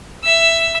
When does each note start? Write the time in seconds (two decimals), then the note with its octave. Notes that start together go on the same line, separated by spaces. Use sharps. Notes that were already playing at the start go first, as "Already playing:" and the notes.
0.24 E5 E6